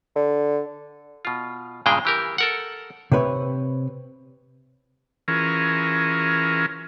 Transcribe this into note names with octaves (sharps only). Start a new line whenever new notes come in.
D3
B2 F4
G2 A#2 C#3 G#3 G#4 G5
E3 G4 A#4
A4 A#4 F#5
C3 C4 B4 C#5
E3 C#4 F4 G#4 A#4